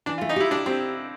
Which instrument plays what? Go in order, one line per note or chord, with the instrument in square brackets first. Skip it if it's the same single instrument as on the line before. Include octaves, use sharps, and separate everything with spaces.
[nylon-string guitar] E3 [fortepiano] D4
[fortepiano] F4
[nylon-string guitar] A3
[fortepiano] D#4
[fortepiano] E4 [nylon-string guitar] G4
[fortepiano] D4 [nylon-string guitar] G4
[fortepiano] C4 [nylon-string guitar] G4